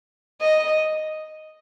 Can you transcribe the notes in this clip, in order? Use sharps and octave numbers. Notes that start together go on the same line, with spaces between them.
D#5